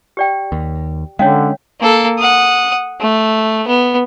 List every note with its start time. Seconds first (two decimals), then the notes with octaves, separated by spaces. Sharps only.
0.17 G4 D5 G5
0.52 D#2
1.19 D3 G#3 C#4 D4 C#5 F5 G5
1.81 A#3 A4
2.19 F#5 D#6
3.01 A3
3.67 B3